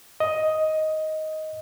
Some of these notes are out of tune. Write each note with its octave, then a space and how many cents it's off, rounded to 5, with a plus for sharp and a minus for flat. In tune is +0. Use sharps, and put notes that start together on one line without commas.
D#5 +10